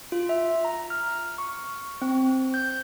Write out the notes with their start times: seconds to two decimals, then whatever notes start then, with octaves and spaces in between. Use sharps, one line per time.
0.12 F4
0.29 E5
0.65 A#5
0.90 F6
1.38 C#6
2.02 C4
2.54 G6